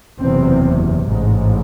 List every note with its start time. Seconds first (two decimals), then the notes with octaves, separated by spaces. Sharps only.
0.20 F#1 E2 C3 C4
1.05 A1 G#2